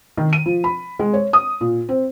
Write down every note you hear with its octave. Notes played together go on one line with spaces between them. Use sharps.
D#3
D#7
F3
B5
G#3
C#5
D#6
A#2
C4